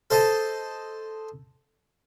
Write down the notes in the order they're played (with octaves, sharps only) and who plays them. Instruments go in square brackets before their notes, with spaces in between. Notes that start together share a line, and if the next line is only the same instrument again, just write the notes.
[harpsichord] A4 C5 D#5 A5